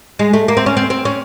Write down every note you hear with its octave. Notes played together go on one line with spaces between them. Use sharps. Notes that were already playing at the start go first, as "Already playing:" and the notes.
G#3
A3
A#3
C4
C#4
C4
C4
C#4